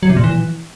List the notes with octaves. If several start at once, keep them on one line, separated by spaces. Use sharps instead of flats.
F#3
C3
A#2
E3